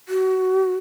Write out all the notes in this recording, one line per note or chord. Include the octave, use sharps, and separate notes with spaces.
F#4